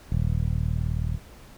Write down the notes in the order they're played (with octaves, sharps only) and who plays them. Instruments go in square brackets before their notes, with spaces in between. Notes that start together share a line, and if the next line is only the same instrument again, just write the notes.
[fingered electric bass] D#1